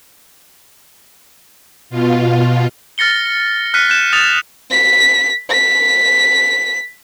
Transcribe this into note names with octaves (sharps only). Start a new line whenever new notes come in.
B2 F4
F6 A6 A#6 C#7 G7
F6 F#6 B6 C#7 D#7
F#6 G6 E7
D#6 A6 F7
B6
B6